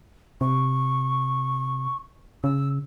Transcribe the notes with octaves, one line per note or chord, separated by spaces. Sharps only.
C3 C#6
C#3 E6